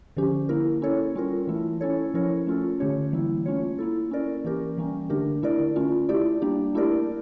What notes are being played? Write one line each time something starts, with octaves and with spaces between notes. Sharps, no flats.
D3 F3 C#4 G4
A#3 E4 A#4
C#4 E4 A4 C#5
G3 C#4 F4 A#4
E3 A3 E4
C#4 E4 A4 C#5
F3 C#4 E4 A#4 C#5
A3 C#4 F4 A4
D3 A3 C#4 G4 C#5
E3 G3 A#3 E4
A3 C#4 F4 C#5
A#3 E4 A4
C#4 E4 A#4 D5
E3 A#3 C#4 G4 A#4
E3 G3 A#3 C#4
D3 A3 D4 G4 A#4
D3 A3 E4 A#4 D5
A3 C#4 F4
A3 E4 G4 D5
G3 A#3 D4 G4
A3 E4 G4 A#4 D5